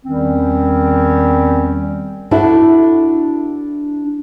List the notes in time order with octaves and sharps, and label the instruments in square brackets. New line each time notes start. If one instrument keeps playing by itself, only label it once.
[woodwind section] E2 D#3 G3 C4 C#4
[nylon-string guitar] D4 E4 F#4 A4